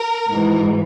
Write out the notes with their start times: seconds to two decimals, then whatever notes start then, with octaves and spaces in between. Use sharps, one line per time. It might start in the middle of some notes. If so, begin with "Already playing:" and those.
Already playing: A#4
0.29 G#1 G#2 E3